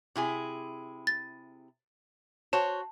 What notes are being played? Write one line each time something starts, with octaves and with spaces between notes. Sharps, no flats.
C3 E4 G#4
A6
F#4 C5 C#5 A5